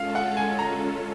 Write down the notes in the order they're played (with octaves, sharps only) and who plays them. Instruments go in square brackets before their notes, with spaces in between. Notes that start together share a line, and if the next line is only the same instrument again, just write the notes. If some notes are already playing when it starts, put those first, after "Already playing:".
Already playing: [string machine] G#3 C#4 F4 A4 [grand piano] F5
[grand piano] F#5
G#5
A#5